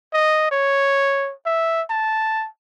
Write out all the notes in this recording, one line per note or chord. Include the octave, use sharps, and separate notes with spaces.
D#5
C#5
E5
A5